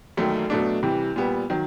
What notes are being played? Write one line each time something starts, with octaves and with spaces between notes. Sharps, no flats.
E1 D#2 D#3 F#3 A3
B2 F#3 A3 D4
C3 E3 G3
A#2 G3 B3
D#3 F#3